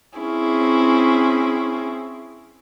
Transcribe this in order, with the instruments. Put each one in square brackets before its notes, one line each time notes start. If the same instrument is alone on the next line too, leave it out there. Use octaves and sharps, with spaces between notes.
[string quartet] C4 C#4 E4 G#4